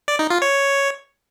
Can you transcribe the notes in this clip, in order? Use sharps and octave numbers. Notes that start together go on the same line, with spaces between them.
D5
D#4
F4
C#5